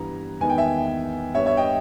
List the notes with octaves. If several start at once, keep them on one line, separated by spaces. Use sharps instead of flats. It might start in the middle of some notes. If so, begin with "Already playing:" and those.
Already playing: G2 E3 G3 B3 A#5
E2 D#3 G#3 B3 G#5
G5
E5 G#5
G2 G3 B3 C#5 E5
C#5 E5
D#5 G5